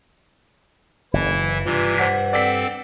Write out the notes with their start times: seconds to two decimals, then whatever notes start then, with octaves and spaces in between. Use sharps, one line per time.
1.13 F#1 E3 E4
1.65 G2 C3 E3 F4
1.98 C5 F#5 B6
2.33 C4 A4 D5 B6